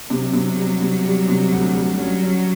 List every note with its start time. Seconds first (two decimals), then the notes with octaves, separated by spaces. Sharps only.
0.10 C3 F#3
0.33 C3
0.57 G3
0.81 C3
1.05 G3
1.28 C3
1.52 D2
1.75 G3
1.98 F#3 C#4
2.23 C#4